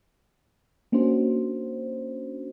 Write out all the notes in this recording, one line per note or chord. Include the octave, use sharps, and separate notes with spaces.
A#3 C#4 D4 F#4 C5